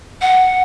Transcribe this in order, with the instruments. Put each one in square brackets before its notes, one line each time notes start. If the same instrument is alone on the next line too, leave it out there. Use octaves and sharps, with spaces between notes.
[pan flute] F#5